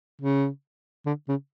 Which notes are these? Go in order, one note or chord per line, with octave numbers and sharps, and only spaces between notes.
C#3
D3
C#3